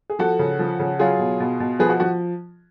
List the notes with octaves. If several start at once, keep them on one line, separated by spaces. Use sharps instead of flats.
G#4
F3 F#4 A4
C#3
F3
C#3
F#3 F4 G#4
B2
B2
B2
F3 G#4 B4
F#4
F3 F#4